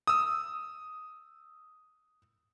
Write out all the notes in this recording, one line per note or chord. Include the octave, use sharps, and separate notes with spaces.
D#6 E6